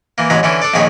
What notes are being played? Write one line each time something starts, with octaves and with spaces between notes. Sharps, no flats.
E3 A#3
A1 E2 F#3 G#3 A#5 B5
D3 E3 C#4 E4
D4 A4 D5
A#1 F2 D#3 G#4 C#5 B5